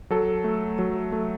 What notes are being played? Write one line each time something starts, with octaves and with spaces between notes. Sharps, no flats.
F#3 A4
A3
F#3
A3